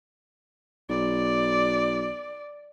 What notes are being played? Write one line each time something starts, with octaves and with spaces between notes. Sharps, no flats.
B1 D5